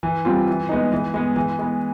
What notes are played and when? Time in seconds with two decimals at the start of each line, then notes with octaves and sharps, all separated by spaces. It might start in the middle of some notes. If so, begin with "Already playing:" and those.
0.03 E3
0.25 G3 C4 F4
0.48 E3
0.69 G#3 B3 D#4
0.92 E3
1.14 G#3 B3
1.36 E3
1.59 G#3 B3